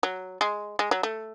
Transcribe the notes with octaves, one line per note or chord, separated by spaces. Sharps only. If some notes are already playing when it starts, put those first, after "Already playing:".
F#3
G#3
G#3
F#3
A3